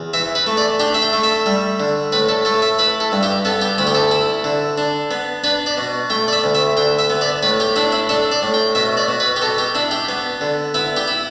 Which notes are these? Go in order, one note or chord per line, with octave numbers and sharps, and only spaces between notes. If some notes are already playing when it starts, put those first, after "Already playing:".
Already playing: E2
E3 E5
B4
A3
D5
D4 G4
E5
G5
A3
E5
G3
D3
A2 B4
A4
A3 A4
E5
E4 B4
A4
G2
G4
B3 A4
G4
D2 E4
G4
A4
E4
D3
D4
B3
D4 B4
D5
B2
A3 G5
D5
E5
D2
E5
D3 G5
E5
B3
D5
A2 B4
G4
D4 E4
E4
D4 A4
D5
A2
G5
B2 E5
D5
B2
B4
G4
B2 A4
G4
D4 E4
G4
B3
D3
B3 E4
G4
E4